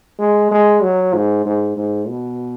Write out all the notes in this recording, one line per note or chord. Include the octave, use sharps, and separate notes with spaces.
G#3
G#3
F#3
G#2
G#2
G#2
B2